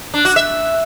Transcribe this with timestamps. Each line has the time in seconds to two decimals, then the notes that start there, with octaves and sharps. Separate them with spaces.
0.14 D4
0.25 F#4
0.36 E5